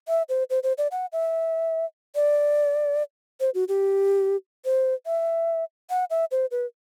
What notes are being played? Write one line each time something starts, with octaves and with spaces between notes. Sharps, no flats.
E5
C5
C5
C5
D5
F#5
E5
D5
C5
F#4
G4
C5
E5
F#5
E5
C5
B4